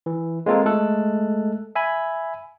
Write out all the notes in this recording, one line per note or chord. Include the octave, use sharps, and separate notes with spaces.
E3
G#3 A#3 C4 F4 A4 A#4
G#3 A3 A4 F#6
E5 G#5 B5